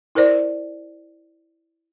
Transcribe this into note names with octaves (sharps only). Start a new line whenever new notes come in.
E4 A#4 C5 D5